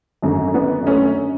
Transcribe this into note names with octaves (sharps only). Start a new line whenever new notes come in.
G#1 F#2 D3
B3 D4
A3 C#4